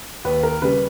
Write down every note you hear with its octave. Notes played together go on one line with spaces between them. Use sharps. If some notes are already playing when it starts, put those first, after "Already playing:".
D#2 B4
A#4
C#3 G3 B4